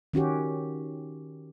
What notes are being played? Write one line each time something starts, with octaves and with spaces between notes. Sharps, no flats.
D#3 C#4 F#4 G4